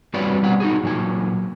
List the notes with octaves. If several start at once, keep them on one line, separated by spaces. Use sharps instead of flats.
G3 C4 F#4 B4 C#5 D5
B2 G3 F#5
D#4 F#4 G#4
A#2 F#3 G#5